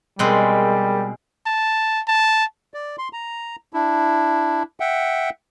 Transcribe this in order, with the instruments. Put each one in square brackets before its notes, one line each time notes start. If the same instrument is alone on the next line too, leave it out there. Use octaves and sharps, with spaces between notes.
[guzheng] B2 G#3 C4 [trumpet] G3 [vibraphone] G#4 A#4
[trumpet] A5
A5
[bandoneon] D5
C6
A#5
D4 E4
E5 F#5 G5